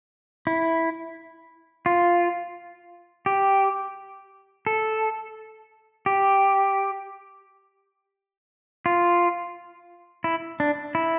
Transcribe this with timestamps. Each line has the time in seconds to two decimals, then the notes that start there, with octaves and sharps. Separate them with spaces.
0.47 E4
1.86 F4
3.26 G4
4.66 A4
6.06 G4
8.86 F4
10.24 E4
10.60 D4
10.95 E4